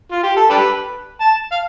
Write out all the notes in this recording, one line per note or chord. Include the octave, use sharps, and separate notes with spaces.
F4
G4
A4
D4 G4 B4
A5
F5